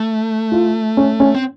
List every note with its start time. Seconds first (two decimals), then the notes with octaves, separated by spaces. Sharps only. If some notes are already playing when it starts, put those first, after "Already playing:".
Already playing: A3
0.52 F4
0.97 C#4
1.20 C#4
1.34 C4